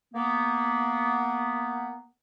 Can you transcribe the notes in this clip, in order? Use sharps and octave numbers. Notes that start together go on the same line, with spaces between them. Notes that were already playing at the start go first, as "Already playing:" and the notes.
A#3 B3